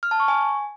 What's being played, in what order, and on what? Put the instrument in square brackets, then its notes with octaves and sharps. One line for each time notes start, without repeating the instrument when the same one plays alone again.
[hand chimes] F6
A5
C#6
G#5